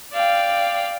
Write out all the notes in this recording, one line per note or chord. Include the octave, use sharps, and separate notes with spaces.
D5 F5 G5